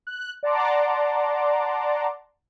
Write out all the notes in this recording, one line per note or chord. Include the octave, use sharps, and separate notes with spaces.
F#6
D5 F#5 A5 A#5 C6 D6